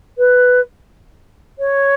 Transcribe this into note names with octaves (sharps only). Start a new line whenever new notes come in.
B4
C#5